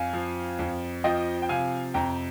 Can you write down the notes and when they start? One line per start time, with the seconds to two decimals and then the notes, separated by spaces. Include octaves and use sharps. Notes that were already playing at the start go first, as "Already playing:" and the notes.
Already playing: F2 F5 G#5
0.13 F3
0.59 F2
1.04 F3 D#5 G5
1.42 G5
1.49 C3 F5 G#5
1.94 F2 G5 A#5